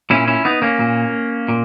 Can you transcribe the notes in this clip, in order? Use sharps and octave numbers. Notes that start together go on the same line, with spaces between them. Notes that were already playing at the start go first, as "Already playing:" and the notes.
A#2 C#4 E4
C#4 E4
B3 D#4
A#3 C#4
A#2
A#2